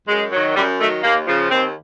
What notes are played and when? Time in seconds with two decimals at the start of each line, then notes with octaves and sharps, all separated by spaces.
0.08 F#2 G#3
0.32 D#3 F#3
0.56 F#2 G3
0.79 D#3 F#3 A3
1.03 D#2 A#3
1.27 C#3 F3
1.50 D#2 C4